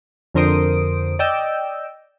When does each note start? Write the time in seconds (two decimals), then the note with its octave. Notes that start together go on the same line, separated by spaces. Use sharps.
0.34 F2 D3 A#4 C5 D#6 D7
1.19 D5 D#5 G5 E6